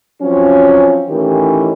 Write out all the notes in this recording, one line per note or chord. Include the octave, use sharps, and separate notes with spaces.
F3 F#3 C4 C#4
A2 D#3 E3 C#4 G4